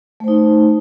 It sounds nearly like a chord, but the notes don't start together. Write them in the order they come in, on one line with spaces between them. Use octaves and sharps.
A3 C5 D#4